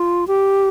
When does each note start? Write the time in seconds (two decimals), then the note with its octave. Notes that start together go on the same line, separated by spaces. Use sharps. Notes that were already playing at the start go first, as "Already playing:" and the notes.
Already playing: F4
0.28 G4